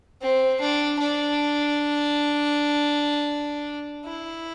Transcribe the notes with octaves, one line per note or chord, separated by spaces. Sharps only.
C4
D4
D4
E4